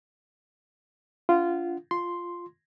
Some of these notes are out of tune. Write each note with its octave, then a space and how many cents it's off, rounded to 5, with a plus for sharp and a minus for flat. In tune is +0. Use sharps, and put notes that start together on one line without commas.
D4 -40 F4 -15 F#5 +0
F4 +0 C6 +0